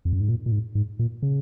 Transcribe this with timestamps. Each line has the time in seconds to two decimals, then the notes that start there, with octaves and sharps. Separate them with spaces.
0.05 F2
0.13 F#2
0.20 G#2
0.28 A#2
0.46 A#2
0.52 G#2
0.75 G#2
0.99 A#2
1.22 C#3